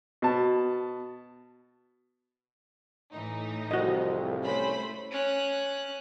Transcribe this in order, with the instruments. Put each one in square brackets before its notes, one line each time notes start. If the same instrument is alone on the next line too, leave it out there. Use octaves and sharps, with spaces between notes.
[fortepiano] B2 A5
[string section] A2 E3 D#4
[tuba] C2 [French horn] F2 [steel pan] F#4 D#5
[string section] A3 C5 B5 [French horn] C#4
[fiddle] C#4 F#6